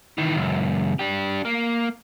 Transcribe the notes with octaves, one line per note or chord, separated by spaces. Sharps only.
D#3 E3
C#2 F#2
D4 G4
A#3